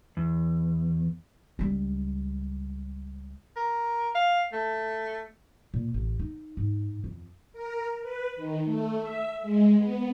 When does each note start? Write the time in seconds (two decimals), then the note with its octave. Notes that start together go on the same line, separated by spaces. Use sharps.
0.17 E2
1.59 C#2 G3
3.56 A#4
4.15 F5
4.53 A3
5.74 A#2
5.94 A1
6.19 D#4
6.57 G#2
7.04 F2
7.53 A#4
8.02 B4
8.36 D#3
8.65 A3
9.00 E5
9.42 G#3
9.77 B3